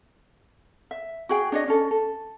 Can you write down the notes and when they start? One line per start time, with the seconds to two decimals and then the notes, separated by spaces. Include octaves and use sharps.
0.91 E5
1.29 F#4 G#4 G5
1.52 D4 C#5 D#5
1.68 C#4 A4
1.91 A4